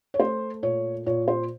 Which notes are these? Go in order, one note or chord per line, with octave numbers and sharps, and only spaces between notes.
C#5
A3 C5
A#2 C#5
A#2 C#5
C5